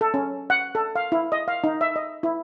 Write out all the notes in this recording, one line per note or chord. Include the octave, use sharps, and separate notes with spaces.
A4
C#4
F#5
A4
F5
E4
D#5
F5
D#4
E5
D#5
E4